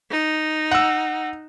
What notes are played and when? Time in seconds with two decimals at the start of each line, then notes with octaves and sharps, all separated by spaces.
0.11 D#4
0.71 F#5 E6